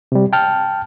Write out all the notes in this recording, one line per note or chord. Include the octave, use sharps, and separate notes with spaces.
C3 G3
G5 A5 F6